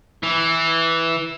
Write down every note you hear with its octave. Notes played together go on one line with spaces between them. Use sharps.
E3